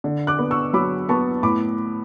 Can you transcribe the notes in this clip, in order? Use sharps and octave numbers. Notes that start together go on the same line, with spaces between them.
D3
D6 F#6
B3
C#6 E6
F#3 B5 D6
B3 A5 C#6
A2 B5 D6